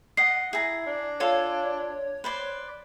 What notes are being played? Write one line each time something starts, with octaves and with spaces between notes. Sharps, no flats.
D#5 F#5 C7
E4 G#4 A#5
D4
F4 A4 C#5 G#5
B4 C5 D5